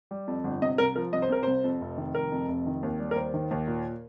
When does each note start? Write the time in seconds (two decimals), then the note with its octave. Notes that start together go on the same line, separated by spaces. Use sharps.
0.11 G3
0.27 F2
0.44 G1
0.62 C3 D#5
0.78 C2 A#4
0.96 F3 A#4
1.13 C2 D#5
1.22 C5
1.30 C3 A#4
1.43 C2 C5
1.64 F2
1.81 F1
1.98 D#3
2.15 F1 A#4
2.32 F2
2.48 F1
2.66 D#3
2.83 D#2
3.00 G3
3.11 A#4
3.16 D#2 C5
3.34 D#3
3.51 D#2
3.68 A#2